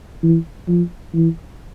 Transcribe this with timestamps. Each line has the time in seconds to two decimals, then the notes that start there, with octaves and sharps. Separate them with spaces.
0.23 E3
0.68 F3
1.14 E3